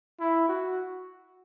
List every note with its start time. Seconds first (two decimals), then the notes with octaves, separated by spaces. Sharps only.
0.20 E4
0.49 F#4